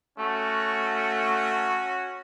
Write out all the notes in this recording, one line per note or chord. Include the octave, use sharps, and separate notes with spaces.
A3 C#4 F#4